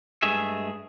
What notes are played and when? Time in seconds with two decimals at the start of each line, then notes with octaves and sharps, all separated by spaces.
0.22 G2 G#3 A3 G#4 E5